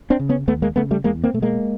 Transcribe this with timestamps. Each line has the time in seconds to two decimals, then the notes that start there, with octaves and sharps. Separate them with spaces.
0.10 C4 D4
0.20 C#3
0.29 B3 C#4
0.47 D#2 A3 B3
0.62 G#3 A#3
0.76 C#3 A3 B3
0.91 G3 A3
1.04 E2 G#3 A#3
1.24 A#3 C4
1.34 B2 A3
1.42 G#3 A#3